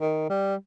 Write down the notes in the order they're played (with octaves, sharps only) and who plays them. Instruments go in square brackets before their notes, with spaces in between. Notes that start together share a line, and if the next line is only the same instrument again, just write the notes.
[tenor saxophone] D#3
G3